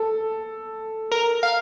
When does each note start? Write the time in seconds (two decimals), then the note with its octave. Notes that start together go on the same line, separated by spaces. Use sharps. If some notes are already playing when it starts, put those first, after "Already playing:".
Already playing: A4
1.11 A#4
1.43 F5